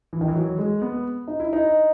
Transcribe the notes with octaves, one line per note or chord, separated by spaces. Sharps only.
E3
D#3
E3
F#3
G#3
B3
D#4
E4
D#4